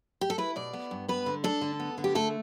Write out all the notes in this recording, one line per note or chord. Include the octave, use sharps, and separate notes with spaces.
G4
A4
E4 B4
B2 D5
B3
G2
B3 B4
D3
D4 A4
D3
B3
D3
G4
A3 A4